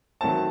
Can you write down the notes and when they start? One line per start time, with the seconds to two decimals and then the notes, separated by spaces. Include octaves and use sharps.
0.21 D#3 F#3 A3 C4 A5